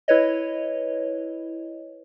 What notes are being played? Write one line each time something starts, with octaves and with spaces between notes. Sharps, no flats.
E4 B4 C#5 D#5